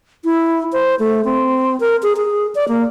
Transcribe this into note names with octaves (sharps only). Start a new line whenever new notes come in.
E4
C5
A3
C4
A#4
G#4
G#4
D5
A#3